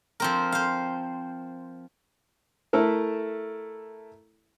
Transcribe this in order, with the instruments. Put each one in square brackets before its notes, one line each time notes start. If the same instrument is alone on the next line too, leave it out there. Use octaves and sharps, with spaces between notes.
[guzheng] F3 C4 A#4
C5 F5
[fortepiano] A3 E4 A4 A#4